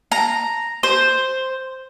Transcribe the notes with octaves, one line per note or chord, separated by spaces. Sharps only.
A#5
C5